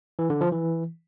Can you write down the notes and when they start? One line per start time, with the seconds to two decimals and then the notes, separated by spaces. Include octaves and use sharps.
0.19 E3
0.30 D3
0.41 F3
0.52 E3